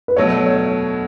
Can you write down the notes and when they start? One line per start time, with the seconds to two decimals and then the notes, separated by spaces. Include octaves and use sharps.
0.08 B4
0.16 B2 F#3 A3 C#5
0.46 C#5